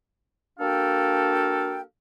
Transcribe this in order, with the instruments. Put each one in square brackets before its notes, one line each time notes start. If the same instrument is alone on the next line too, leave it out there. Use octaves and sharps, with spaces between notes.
[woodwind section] A#3 D4 F#4 A4 F5 G5